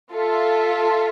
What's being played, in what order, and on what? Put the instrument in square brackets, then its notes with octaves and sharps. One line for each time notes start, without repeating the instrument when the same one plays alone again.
[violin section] F4 A4 E5